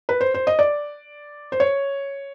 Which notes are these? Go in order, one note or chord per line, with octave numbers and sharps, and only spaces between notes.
B4
C5
C5
D#5
D5
C5
C#5